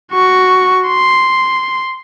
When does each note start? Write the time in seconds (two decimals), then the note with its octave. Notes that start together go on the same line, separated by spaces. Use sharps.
0.13 F#4 C#6
0.88 C6